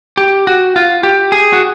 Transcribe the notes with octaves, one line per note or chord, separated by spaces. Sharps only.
G4
F#4
F4
G4
G#4
F#4